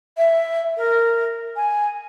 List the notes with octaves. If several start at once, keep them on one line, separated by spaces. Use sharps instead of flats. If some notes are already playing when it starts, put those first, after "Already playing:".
E5
A#4
G#5